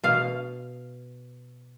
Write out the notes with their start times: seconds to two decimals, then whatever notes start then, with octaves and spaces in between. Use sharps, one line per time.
0.04 B2 F5